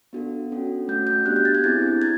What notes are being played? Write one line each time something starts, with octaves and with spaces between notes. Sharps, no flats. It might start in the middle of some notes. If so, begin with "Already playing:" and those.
B3 D4 F#4 A4
C#4 F#4 A4
A3 C#4 F#4 G6
G6
B3 D4 G4 F#6
G6
A6
G#6
C4 E4 G#4 A6
D4 G#6